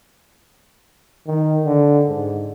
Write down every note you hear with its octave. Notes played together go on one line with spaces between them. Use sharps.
D#3
D3
G#2